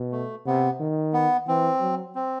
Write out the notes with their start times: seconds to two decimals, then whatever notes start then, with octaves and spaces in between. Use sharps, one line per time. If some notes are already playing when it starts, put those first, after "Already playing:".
Already playing: B2
0.12 A3
0.46 C3 B3
0.80 D#3
1.13 B3
1.48 E3 C4
1.81 F#3
2.15 C4